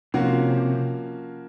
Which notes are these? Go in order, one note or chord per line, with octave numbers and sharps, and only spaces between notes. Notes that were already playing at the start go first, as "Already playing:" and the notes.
C3 F3 A#3 C#4 F#4